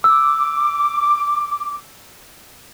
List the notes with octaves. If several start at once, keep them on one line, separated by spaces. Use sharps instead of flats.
D6 E6